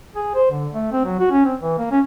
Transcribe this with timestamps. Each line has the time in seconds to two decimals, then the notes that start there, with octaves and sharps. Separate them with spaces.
0.15 G#4
0.35 C5
0.51 D3
0.74 A3
0.92 C4
1.05 F#3
1.19 F#4
1.31 C#4
1.45 C4
1.60 E3
1.78 A#3
1.91 C#4